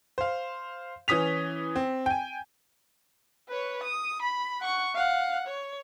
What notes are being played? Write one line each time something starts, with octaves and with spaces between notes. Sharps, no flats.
C5 F5
E3 C#4 D#6 B6 F7
C4
G5 G#5
B4 C#5
D#6
B5
F#5 C#6
F5 F#5
C#5